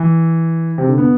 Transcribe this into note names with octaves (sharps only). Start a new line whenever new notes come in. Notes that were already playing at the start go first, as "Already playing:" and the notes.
Already playing: E3
C3
D3
B3